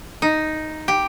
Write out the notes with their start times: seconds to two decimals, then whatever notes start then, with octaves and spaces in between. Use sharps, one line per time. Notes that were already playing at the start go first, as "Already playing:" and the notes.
0.22 D#4
0.88 G4